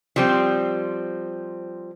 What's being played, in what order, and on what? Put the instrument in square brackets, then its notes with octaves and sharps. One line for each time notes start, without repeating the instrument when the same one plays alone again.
[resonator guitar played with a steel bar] F3 G3 C4